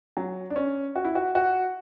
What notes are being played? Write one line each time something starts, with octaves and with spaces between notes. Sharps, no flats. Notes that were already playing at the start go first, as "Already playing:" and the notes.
F#3
D4
C#4
F#4
E4
F#4
F#4